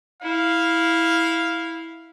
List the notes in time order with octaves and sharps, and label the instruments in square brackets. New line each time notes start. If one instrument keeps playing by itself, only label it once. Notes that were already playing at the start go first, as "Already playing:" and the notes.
[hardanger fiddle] E4 [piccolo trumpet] F5